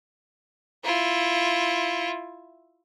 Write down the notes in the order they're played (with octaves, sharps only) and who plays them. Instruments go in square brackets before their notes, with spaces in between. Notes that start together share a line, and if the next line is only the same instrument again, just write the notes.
[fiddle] E4 F4